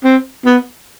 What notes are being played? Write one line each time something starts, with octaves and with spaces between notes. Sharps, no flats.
C4
B3